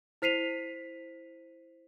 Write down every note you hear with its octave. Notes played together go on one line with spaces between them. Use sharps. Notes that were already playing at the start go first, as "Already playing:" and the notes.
E4 C5 B6 C7 D#7 F7